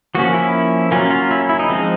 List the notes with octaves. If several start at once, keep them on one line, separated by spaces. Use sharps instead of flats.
F3 A#3 C#4 F#4
E4
F#3 A#3 C#4 F4
F4
E4
E4
D#4
F3 G#3 C4